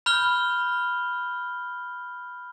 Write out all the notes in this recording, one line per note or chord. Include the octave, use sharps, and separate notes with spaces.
B5 F6 G6 G7